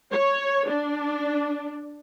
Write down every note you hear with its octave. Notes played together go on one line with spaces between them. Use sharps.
C#5
D4